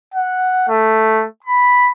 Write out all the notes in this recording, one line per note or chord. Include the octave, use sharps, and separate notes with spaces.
F#5
A3
B5